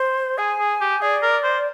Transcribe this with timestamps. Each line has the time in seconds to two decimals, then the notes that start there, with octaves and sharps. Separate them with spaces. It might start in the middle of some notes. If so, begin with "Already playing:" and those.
Already playing: C5
0.38 G#4 G#5
0.59 G#4
0.81 G4
1.02 G#4 D5
1.23 A#4
1.43 C5